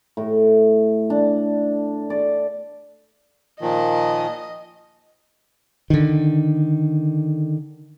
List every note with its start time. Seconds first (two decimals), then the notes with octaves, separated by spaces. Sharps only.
0.17 A2
1.10 D4
2.10 D5
3.61 A#2 D#3 F3 D#5
5.90 D3 D#3